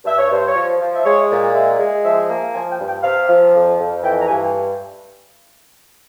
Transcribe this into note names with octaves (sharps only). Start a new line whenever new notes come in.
G2 E5
C#5
G2 C5
C#5
F3
F3
E5
G#3 C#5
A#2
G#3 E5
G#3
F3 E5
A#3
F3 G#5
G5
G2
G5
C3 F5
F3
F2
F2
E3 G5
A#5
G2 G#5